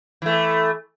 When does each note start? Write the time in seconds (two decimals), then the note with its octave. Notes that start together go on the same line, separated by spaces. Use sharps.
0.22 E3 A3